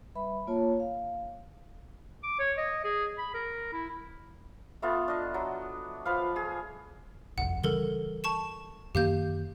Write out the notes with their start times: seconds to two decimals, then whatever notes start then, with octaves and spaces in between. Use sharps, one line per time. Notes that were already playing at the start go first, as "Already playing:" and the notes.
0.15 G3 B4 E5 B5
0.47 A#3 F4 C#5 A5
0.80 F5
2.23 D6
2.39 C#5
2.58 D#5
2.84 G#4
3.18 B5
3.34 A#4
3.73 E4
4.82 A3 B3 F4
5.08 D4 D#5
5.34 F#3
6.05 F3 B4 F5
6.36 G#4
7.38 G1 C2 F2 F#5
7.63 C#3 E3 G3 A4 A#4 G7
8.24 A5 C#6 E7
8.95 F#2 D#3 A#3 G4 F5 G6